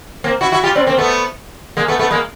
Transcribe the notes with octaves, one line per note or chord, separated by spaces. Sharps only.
A#3 C4
E4 F#4
E4 F#4
F4 G4
C4 D4
A#3 C4
A3 B3
G#3 A#3
A3 B3
A3 B3
G#3 A#3